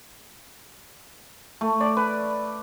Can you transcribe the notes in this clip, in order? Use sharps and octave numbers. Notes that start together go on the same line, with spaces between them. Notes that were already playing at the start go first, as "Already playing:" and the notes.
A3
D5
B4